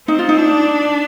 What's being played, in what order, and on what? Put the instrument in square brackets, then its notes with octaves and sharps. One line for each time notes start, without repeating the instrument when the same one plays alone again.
[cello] C4 [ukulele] D#4
[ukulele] F4
D#4
[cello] D4